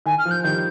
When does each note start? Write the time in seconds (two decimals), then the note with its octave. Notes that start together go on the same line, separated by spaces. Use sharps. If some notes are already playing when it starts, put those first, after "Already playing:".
0.06 D#3 G#5
0.19 F6
0.25 F3
0.31 G6
0.44 D#3 G3 G6